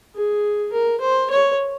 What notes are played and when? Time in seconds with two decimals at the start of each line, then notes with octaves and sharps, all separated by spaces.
0.15 G#4
0.72 A#4
1.00 C5
1.30 C#5